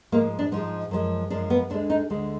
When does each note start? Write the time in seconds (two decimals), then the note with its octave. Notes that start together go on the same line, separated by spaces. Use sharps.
0.12 G#2 F3 G#3 A#3
0.39 D4
0.52 G#2 F3 G#3 D#4
0.91 F#2 F3 G#3
1.30 F#2 F3 G#3 D4
1.50 B3
1.70 D2 D3 G#3 D4
1.90 D#4
2.10 D2 D3 G#3